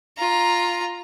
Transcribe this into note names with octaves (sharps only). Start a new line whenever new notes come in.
F4 A#5